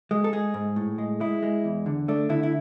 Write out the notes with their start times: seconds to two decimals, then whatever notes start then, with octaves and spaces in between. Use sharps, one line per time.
0.11 G#3
0.24 A4
0.33 G#3 G#4
0.54 G#2
0.76 A2
0.98 G#3
1.20 G#3 E4
1.43 G#3
1.64 E2
1.86 D3
2.08 A3 D4
2.29 D3 E4
2.43 E4